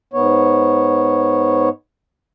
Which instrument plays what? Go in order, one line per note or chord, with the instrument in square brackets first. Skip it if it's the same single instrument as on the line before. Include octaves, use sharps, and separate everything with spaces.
[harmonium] G#2 B3 C#5